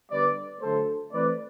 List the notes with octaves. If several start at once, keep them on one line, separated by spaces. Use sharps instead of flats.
D3 G3 B3 B4 D5
D3 F#3 A3 A4 C5
E3 A3 C4 B4 D5